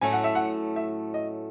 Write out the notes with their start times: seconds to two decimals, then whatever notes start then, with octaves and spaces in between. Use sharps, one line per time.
0.01 A2 F#3 A3 C#4 G#5
0.13 F#5
0.24 E5
0.35 F#5
0.76 E5
1.14 D#5